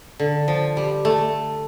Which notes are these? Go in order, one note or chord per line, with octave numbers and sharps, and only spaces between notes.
D3
F3
G3
A3